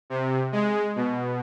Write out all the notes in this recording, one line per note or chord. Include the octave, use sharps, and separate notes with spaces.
C3
G#3
B2